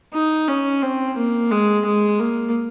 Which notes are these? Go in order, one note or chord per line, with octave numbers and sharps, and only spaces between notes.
D#4
C#4
C4
A#3
G#3
G#3
A#3